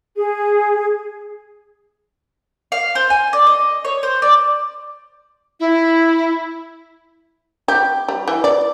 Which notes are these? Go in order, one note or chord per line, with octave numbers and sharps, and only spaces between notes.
G#4
F5
C5
G#5
D5
D#5
C#5
C5
D5
E4
G4
G3
E3
D5